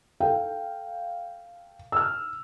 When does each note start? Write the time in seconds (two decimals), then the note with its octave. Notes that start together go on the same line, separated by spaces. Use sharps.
0.20 A4 F5 G5
1.92 E6 F6